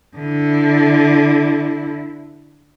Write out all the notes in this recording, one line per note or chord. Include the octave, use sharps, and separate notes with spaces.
D3 E4